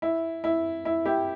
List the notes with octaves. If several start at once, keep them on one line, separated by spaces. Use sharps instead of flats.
E4
E4
E4
E4 G4